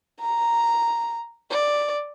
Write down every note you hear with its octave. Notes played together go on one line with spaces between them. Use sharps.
A#5
D5